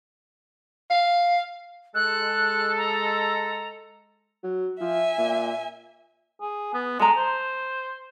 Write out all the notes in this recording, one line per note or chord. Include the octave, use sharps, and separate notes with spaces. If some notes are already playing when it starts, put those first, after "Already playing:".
F5
G#3 A4 F#6
A#5
F#3
F3 E5 G#5
A#2
G#4
B3
G#3 A4 A#5
C5